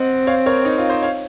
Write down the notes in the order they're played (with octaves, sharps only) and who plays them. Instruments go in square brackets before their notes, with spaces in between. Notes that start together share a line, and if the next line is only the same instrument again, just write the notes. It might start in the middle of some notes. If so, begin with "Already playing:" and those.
Already playing: [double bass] C4 [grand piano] D#5 F#5
[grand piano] C#5 F5
A#4 C#5
D#4
F4
C5 D#5
C#5 F5